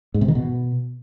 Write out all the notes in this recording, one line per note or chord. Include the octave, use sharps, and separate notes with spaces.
G#2
C3
D#3
B2